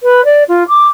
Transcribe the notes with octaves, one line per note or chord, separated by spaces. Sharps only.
B4
D5
F4
D6